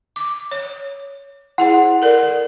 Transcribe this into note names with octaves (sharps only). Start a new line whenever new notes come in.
D6
C#5
E4 G#4 C5 F#5
A4 A#4 D5